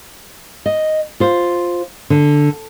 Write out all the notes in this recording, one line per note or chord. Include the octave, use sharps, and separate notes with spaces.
D#5
F4 C5
D3